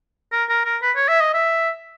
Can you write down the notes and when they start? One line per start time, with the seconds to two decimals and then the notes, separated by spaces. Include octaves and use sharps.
0.32 A#4
0.49 A#4
0.65 A#4
0.82 B4
0.96 C#5
1.08 E5
1.20 D#5
1.34 E5